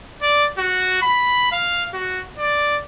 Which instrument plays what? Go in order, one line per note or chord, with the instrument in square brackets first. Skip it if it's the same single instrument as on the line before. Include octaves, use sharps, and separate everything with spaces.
[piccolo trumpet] D5
F#4
B5
F5
F#4
D5